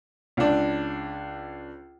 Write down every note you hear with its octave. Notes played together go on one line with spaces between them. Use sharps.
C#2 D4